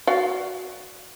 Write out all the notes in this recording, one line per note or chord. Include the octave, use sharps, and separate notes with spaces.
F#4 D5 F5